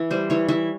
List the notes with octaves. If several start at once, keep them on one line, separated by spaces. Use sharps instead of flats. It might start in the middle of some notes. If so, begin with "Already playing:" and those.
Already playing: E3 E5
G3 C5
E3 C#5
E3 E5